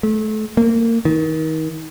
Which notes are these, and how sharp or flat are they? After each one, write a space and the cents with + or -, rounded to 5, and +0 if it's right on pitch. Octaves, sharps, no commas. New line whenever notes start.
A3 -30
A#3 -25
D#3 +30